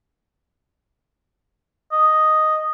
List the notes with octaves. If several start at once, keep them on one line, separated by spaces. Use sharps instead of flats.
D#5